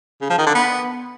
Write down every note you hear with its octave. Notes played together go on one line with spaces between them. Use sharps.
C#3
F3
D#3
D3
B3